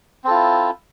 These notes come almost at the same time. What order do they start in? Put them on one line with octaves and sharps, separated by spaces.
C4 A4 F4 E4